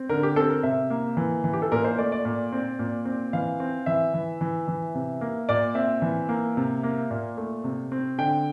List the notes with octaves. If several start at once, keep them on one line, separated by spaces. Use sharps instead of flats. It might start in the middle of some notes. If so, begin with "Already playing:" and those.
Already playing: C4
D3 A#4
G4
C4 A4
A#4
C3 E5
A#3
E3
E3
G4
A4
A#2 A#4
C5
A3 D5
D5
A#2
C4
A#2
C4
E3 F5
C4
E3 E5
E3
E3
E3
C3
A#3
A#2 D5
C4 E5
E3
A#3
C3
A#3
A#2
A3
C3
C4
D3 G5